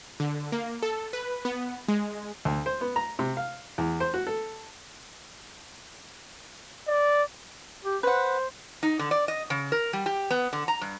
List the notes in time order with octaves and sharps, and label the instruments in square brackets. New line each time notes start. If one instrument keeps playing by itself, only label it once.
[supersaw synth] D3
A#3
A4
B4
B3
G#3
[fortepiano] D2
C5
B3
A#5
C3
F5
E2
C5
F#4
A4
[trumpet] D5
[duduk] G4
[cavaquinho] B4 F#5 [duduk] C5
[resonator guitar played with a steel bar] D#4
D3
D5
D#5
C#3
A#4
G3
G4
B3
D3
A#5
G2